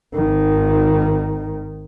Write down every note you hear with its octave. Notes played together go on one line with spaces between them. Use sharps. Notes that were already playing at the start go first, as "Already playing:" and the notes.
G#1 D#3